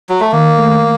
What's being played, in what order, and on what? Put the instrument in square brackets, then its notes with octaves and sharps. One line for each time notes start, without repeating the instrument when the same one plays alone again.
[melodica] F#3
A3
[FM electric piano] D#3 [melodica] A#3
[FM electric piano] A3